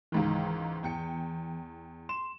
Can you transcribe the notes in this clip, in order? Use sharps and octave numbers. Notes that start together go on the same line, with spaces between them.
C#2 G#2 D#3 E3
E2 G5 C#7
C6 E7